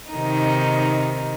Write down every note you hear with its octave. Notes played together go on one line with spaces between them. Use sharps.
C3 D#3 D#4